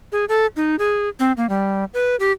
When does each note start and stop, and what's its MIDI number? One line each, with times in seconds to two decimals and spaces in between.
0.12 0.25 68
0.29 0.46 69
0.56 0.76 63
0.79 1.09 68
1.20 1.32 60
1.37 1.49 58
1.49 1.85 55
1.94 2.16 71
2.20 2.32 67